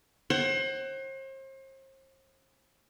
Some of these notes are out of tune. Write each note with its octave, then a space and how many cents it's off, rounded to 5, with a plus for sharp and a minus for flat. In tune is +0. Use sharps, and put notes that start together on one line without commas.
C5 +40 F#5 +35